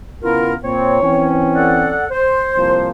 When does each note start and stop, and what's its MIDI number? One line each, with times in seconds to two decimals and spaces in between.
0.23 0.56 49
0.23 0.56 59
0.23 0.55 64
0.23 0.56 65
0.23 0.55 70
0.64 0.99 46
0.64 0.99 60
0.64 1.31 73
1.03 1.96 52
1.03 1.96 60
1.03 1.96 61
1.55 2.06 69
1.55 2.06 74
1.55 2.06 78
2.10 2.88 72
2.57 2.91 36
2.57 2.91 46
2.57 2.91 53